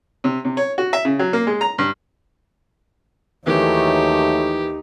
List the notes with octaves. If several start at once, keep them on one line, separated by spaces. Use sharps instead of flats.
C3
C3
C#5
F#4
E5
C#3
F#3
A#3
G#3
A#5
G2
D#2 A2 D#3 E3 F#3 A3 D#4 G4